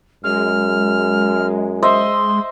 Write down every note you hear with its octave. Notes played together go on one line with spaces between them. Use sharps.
F#2 G#3 F6
C5 D#5 E5 C6